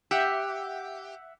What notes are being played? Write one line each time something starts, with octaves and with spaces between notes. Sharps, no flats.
G4 E5 F#5